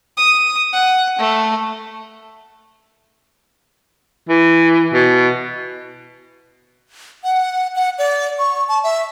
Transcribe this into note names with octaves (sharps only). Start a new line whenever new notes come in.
D#6
F#5
A3
E3
B2
F#5
F#5
D5
C#6
A5
E5